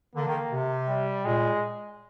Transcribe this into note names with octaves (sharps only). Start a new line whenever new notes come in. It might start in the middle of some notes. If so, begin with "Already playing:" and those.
D3 A#3
D#3
C3
G3
A#2 G#3